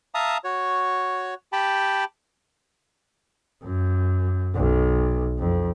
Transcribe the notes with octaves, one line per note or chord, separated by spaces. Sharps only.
E5 F5 A5 A#5 D#6
F#4 C#5
G4 G5 A5 B5
F#2
B1
F2